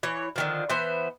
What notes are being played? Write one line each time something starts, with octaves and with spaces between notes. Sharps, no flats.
E3 C#5
D3 D#3 F3
E3 B3 C5